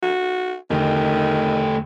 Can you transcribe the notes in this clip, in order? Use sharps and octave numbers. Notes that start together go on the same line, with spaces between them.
F#4
E2 D3 D#3 A3 G4